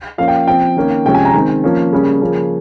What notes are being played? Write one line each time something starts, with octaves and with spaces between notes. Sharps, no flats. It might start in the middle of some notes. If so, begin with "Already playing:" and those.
F3 A#3 C#4 F5
G5
F3 C4 G5
D#3 A#3 C#4
C3 F3 G#3 C#4 G5
G#5
A#5
D#3 G#3 C4
F3 A#3 C#4
C#3 G3 A#3 C#4
C#3 F3 A#3 C#4